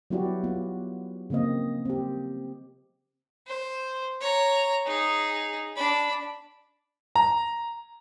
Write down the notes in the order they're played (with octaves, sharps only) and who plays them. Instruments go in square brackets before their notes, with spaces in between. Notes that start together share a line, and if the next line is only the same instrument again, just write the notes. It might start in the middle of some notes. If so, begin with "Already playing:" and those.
[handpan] F#3 B3 E4 F#4 G4 D5
B3 F4
C#3 F3 A#3 C4 D#5
C4 G4
[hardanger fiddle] C5
C#5 A#5
D#4 G#4
D4 B5
[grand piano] A#5